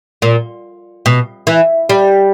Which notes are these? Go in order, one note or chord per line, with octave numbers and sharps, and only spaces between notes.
A#2
B2
E3
G3